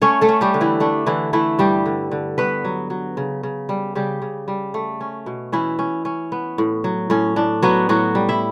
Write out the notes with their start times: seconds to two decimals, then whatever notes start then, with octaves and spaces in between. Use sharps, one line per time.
0.02 A3 C#4 C#5
0.21 A3 A4
0.29 C#4
0.41 G3 G4
0.54 D3
0.61 E3 E4
0.80 A3 D4
1.06 D3 E3 E4
1.33 E3 A3 E4
1.59 G2 G3 G4
1.86 D3
2.12 D3
2.38 G2 B3 B4
2.65 F#3
2.90 F#3
3.17 C#3
3.43 C#3
3.69 G3
3.95 C#3 G3 G4
4.22 C#3
4.48 G3
4.74 A3
5.01 C#4
5.26 B2
5.52 E3 C#4 E4
5.79 C#4
6.05 C#4
6.32 B3
6.58 A2
6.84 F#3
7.10 A2 C#4
7.36 A2 D4
7.63 F#3 B3 F#4
7.89 A2 F#3 F#4
8.15 G3
8.29 E4 E5